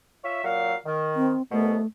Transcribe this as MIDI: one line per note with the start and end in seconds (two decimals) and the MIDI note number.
0.24 0.41 65
0.24 0.41 73
0.24 0.41 76
0.44 0.75 46
0.44 0.75 54
0.44 0.75 77
0.86 1.33 51
1.16 1.42 60
1.52 1.77 36
1.52 1.77 47
1.52 1.86 57
1.52 1.77 59